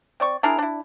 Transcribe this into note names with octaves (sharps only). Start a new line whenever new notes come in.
C4 D5 C#6
D4 E4 G#4 A#4
D4 E4